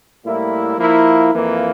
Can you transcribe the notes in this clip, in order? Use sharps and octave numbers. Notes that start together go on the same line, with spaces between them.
A2 G3 A#3 E4
F3 A#3 E4 A#4
F2 E3 A#3